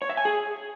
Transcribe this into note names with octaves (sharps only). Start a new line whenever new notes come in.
C#5
E5
G#5
G#4